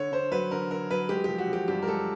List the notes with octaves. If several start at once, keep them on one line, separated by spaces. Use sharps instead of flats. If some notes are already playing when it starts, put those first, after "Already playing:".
Already playing: D3 C#5
D3 C5
F#3 B4
D3 A#4
D3 A#4
F#3 B4
G#3 G4
F3 G4
F#4
F3 G4
G2 G4
A#4
G#3 A4